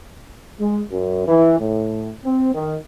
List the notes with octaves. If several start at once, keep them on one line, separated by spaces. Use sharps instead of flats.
G#3
F#2
E3
A2
C4
D#3